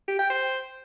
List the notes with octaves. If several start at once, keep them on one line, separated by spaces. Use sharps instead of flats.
G4
G5
C5